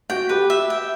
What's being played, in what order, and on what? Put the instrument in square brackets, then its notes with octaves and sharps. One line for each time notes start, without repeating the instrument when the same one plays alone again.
[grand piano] F#4 [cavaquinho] G5
[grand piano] G4 [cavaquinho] B4
[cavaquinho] E5
G5